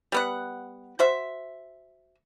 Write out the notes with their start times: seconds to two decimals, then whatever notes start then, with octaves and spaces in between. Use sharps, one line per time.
0.12 G3 B3 F#5
0.99 F#4 C5 E5